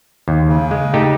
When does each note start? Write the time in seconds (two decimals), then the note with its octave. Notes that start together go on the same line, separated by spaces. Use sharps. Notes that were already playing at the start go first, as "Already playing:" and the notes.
0.28 D#2
0.48 C#3
0.71 G#3
0.94 A3 D#4 G4